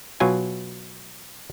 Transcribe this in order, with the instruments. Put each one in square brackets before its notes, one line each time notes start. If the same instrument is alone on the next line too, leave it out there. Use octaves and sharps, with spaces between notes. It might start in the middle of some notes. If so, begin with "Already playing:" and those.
[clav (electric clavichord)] B2 F#3 F4 G#5